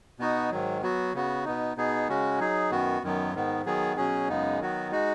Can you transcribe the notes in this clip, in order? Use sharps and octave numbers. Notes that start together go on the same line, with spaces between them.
B2 B3 D#4 F#4
G#2 D#3 F#3
F#3 B3 F#4
C#3 B3 F#4
B2 B3 D#4
B2 B3 D#4 G#4
C#3 G#3 C#4 F#4
F#3 D#4 G#4
F#2 D#3 B3 F#4
F#2 D#3 F#3 B3
G#2 D#3 B3
D#3 F#3 B3 G#4
B2 F#3 C#4 G#4
F#2 C#3 G#3 B3 D#4
D#3 F#3 B3 F#4
G#3 D#4 F#4